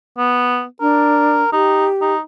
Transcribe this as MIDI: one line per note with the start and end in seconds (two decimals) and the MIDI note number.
0.18 0.64 59
0.81 1.42 62
0.81 1.49 70
1.52 1.86 63
1.52 2.14 67
2.01 2.20 63